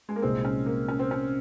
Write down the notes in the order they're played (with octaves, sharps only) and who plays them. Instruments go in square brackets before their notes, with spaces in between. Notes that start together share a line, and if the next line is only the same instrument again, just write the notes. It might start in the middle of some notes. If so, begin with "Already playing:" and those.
[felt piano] G#3
A#3
[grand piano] C2 A#2 G#3 D#4 G#4 [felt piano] C4
[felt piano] C#4
A#3
C#4
C4
C#4